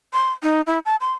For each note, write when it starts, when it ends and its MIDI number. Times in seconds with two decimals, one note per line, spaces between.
0.13 0.32 84
0.43 0.61 63
0.67 0.79 64
0.85 0.96 81
1.01 1.12 84